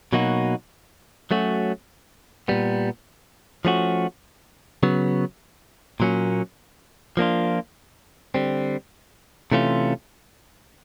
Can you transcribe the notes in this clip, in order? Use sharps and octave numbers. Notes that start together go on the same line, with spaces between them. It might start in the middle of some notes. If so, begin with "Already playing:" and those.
B2 F#3 A#3 D#4 F#4
F#3 A3 C#4 F#4
A#2 G3 B3
F3 A3 C#4 F#4
C#3 F#3 B3
A#2 F#3 A#3 C#4
F3 A#3 D4 F4
D3 G3 C4
C3 E3 A3 C#4 F4